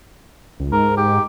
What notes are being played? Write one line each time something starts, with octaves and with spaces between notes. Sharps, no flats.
C#2
G#2 A#4
G4